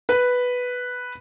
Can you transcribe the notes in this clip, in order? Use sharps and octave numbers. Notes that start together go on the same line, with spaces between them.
B4